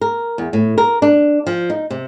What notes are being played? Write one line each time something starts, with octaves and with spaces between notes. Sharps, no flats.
A#4
E2
A2
A#4
D4
F3
D#4
C3